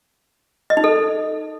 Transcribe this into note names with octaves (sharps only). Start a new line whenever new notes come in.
D#5
D#4
A4